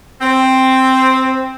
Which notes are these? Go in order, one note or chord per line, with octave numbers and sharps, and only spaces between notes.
C4